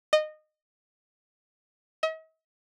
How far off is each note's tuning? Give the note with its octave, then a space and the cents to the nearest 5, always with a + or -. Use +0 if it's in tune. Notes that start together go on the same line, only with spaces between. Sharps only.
D#5 -20
D#5 +45